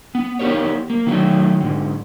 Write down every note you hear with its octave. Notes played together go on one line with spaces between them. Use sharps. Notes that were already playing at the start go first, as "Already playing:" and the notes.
B3
B3 D#4 G4 A#4 C#5
A#3
D#3 F#3 A3
G#2 D3